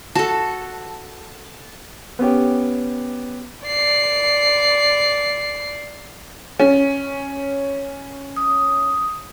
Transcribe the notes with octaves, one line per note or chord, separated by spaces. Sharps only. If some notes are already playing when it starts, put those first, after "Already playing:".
F#4 A4 A5
B3 C#4 G4
D5 C7
C#4
D#6